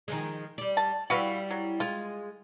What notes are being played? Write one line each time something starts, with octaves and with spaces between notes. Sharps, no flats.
D#3 F3 G#3
G3 D5
A5
G3 E4 F#4 B4 F5
F#3
G#3 F4